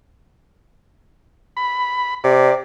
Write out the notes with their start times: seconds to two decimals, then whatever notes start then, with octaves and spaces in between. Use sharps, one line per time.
1.57 B5
2.24 C3 D5